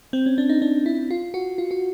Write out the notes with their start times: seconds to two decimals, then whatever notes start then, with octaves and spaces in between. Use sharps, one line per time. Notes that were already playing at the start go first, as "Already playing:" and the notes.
0.13 C4
0.26 C#4
0.38 D4
0.49 D#4
0.62 D4
0.86 E4
1.11 F4
1.34 F#4
1.58 F4
1.71 F#4